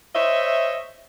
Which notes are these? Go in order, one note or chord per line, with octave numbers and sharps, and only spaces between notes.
C5 C#5 D#5 E5